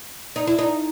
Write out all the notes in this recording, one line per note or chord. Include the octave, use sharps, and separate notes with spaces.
D#4
E4
D#4